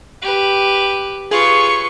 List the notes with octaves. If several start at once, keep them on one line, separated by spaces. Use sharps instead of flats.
G4 B4
F4 G#4 B4 C#5 C#6